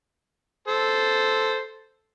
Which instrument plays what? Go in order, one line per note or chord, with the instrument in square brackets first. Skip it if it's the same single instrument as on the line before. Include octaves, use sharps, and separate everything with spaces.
[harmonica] A4 C5